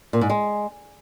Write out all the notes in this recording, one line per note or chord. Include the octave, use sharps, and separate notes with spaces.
A#2
G#2
G#3